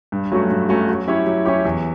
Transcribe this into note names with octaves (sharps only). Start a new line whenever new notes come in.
G2
F#3 A3 C#4 F#4
G2
F#3 A3 C#4 F#4
F#3
C#4 E4 G4 C#5
F#3
C#4 E4 G4 C#5
E2